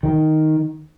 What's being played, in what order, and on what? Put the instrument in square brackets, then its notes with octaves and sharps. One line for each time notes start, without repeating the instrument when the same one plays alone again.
[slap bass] D#3